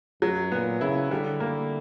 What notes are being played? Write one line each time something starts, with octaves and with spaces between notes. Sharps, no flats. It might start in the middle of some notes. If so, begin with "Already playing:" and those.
F#2 F#3
A#2 B3
C#3 E4
D3 G3
A#3